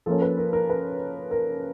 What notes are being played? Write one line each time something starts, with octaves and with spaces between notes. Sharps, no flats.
F3 A#3 C#4 A4
B4
A#4
A#4
B4
A#4